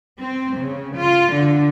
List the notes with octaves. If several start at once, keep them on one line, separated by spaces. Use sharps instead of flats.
C4
C#3
F4
D3